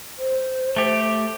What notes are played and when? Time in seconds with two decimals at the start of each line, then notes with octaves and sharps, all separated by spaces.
0.18 C5
0.76 A3 G4